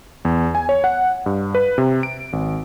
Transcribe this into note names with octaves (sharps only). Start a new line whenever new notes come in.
E2
G#5
C#5
F#5
G2
B4
C3
D7
G#1